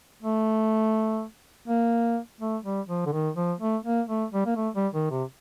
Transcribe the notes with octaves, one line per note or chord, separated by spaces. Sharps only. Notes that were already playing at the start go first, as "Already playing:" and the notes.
A3
A#3
A3
G3
F3
D3
D#3
F3
A3
A#3
A3
G3
A#3
A3
G3
D#3
C3